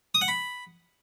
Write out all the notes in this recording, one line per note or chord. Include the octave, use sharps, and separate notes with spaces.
D#6
F#5
B5